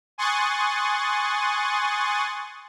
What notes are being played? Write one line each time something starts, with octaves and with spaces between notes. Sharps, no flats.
G#5 C6 C#6 D#6 F#6 A6